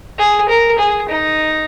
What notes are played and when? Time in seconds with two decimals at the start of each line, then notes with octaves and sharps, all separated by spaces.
0.18 G#4
0.49 A#4
0.78 G#4
1.09 D#4